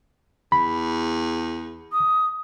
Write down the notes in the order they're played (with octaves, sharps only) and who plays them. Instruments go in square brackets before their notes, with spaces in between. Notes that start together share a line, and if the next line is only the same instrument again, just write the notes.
[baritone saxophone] E2 [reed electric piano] B5
[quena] D#6